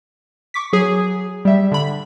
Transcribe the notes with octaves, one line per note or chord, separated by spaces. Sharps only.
C#6 D6 B6
F#3 G#4
G3 E5
D3 B5